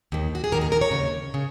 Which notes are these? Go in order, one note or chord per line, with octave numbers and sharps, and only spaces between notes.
D#2 D#3
F#4
G#4
D#2 D#3 A#4
G#4
A#4
C#5
D#2 C#3
C#3